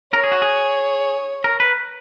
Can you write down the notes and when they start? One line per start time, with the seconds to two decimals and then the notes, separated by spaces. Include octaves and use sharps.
0.13 A#4 C#5
0.24 G#4
0.32 F#4
0.42 G#4
1.44 A#4
1.60 B4